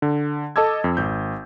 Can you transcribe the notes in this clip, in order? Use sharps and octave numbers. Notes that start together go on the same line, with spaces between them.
D3
A4 D#5 A5 D6 E6 G#6
F2
G#1 G6